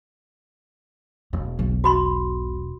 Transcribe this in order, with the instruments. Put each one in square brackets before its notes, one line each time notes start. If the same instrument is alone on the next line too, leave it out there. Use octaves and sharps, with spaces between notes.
[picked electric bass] E1 [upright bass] A#3
[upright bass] B1
[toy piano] F#4 B5 C6